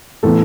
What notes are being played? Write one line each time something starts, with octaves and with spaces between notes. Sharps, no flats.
A2 E3 B3 A4